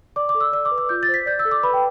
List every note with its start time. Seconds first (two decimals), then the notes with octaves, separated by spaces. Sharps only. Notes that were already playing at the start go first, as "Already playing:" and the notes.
0.16 D5 D6
0.29 D6
0.35 A4
0.41 E6
0.53 D5 E6
0.65 D6
0.71 B4
0.78 D6
0.89 F4 G6
1.03 A6
1.08 C5
1.14 B6
1.26 D5 G6
1.39 E6
1.45 A4
1.51 D6
1.63 B4 B5
1.73 G5